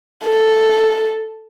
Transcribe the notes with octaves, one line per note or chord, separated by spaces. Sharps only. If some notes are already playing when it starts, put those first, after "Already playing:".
A4